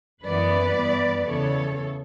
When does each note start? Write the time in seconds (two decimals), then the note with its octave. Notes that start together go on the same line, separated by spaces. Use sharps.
0.22 F#2 E3 B3 B4 D5
0.74 G2 E3 B3
1.25 E2 C#3 E3 B3 A4 C#5